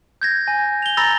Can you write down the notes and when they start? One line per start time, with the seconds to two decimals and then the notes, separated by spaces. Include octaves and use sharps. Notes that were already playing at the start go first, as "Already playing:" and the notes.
0.22 G6 G#6 A#6
0.48 G#5
0.82 F7 G7
0.97 A#5 B5 E6 A6 A#6 F7